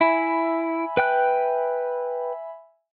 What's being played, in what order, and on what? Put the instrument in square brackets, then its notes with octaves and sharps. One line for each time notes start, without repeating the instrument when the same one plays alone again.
[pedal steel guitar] E4 [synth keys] E5 G#5 B5
[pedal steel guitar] B4 G5 F#6